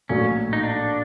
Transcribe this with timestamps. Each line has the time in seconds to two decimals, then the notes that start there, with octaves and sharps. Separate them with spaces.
0.09 A#1 A2 F#3 C#4
0.53 D#4
0.63 D4